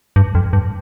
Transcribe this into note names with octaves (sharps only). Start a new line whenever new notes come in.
G2
F2
G2